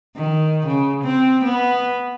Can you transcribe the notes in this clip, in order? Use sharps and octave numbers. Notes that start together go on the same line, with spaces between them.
D#3
C#3
C4
B3